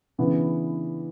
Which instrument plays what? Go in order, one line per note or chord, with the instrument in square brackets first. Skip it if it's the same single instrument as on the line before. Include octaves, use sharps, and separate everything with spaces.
[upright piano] C#3 E3 B3 D4